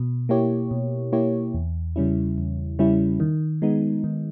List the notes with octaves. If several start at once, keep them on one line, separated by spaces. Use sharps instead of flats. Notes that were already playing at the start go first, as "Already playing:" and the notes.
Already playing: B2
A#3 E4 G4 C#5
B2
A#3 E4 G4 C#5
E2
C#3 G3 C#4 E4
E2
C#3 G3 C#4 E4
D#3
G#3 B3 D#4
D#3